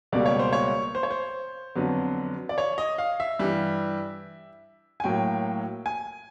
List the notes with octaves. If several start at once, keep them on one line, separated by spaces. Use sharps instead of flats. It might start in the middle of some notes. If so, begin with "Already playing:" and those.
C#2 B2 G3 A#3 D5
C#5
C5
C#5
C5
C#5
C5
F2 D3 F#3 B3
D5
C#5
D#5
F5
E5
G2 E3 G3
G#5
A2 F#3 A#3 G5
G#5